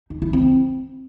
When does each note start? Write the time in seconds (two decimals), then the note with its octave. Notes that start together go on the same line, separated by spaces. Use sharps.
0.10 D#4
0.22 E4
0.33 C4